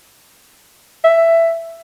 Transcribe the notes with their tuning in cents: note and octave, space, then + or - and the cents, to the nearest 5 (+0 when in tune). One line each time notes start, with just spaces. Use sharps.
E5 +10